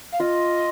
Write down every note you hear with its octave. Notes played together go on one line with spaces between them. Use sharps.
F5
F4 D#5